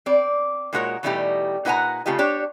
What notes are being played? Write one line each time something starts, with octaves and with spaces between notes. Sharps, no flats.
C4 D5
A#2 G#3 D#4 F#4 A#4 C#5
B2 E3 G3 A3 D#4 G4
A#2 D#4 B4 F#5 G#5 A#5
C#3 A3 F4 G4 D#5
D4 G4 C#5